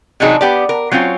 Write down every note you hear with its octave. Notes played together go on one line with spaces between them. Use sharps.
C3 E3 F#3 D4 D#4 G#4
B3 G4 D5
A#4
F#3 C4 C#4 F4